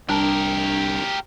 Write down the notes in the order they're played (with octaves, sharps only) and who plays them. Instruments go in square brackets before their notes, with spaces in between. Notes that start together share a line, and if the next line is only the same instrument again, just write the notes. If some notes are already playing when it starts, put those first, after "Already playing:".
[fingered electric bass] C2 G3 [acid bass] D4 [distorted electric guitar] G4 A#4